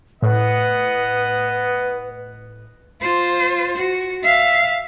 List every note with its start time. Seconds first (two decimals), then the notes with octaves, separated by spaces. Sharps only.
0.22 A2 B3 B4 D#5 F#5
3.01 F4 C5
3.77 F#4
4.24 E5 F5